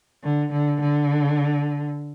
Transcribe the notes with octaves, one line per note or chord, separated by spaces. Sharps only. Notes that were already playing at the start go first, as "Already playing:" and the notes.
D3
D3
D3